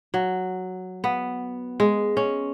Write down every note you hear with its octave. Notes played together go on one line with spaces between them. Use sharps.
F#3
B3
G#3
C#4